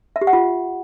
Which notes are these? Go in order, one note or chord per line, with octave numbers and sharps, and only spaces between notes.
E5
G4
F#5
F4